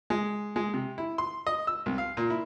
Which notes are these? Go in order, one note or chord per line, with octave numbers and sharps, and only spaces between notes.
G#3
G#3
C3
E4
C6
D#5
E6
C2
F5
A#2
E4